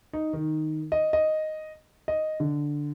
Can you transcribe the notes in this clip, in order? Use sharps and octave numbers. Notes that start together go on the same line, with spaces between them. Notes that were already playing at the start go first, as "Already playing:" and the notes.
D#4
D#3
D#5
D#5
D#5
D3